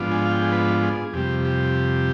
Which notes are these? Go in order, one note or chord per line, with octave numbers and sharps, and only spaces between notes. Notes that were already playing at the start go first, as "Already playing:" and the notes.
Already playing: G#2 F3 B3 D4 F4
G#5
F5
G5
G#4
B4
G#4
F2 C3 G3 G4
G4